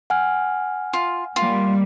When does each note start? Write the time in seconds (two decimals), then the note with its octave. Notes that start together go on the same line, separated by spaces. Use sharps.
0.10 F#5 G#5 F6
0.93 F4
1.36 G3 A#3 F4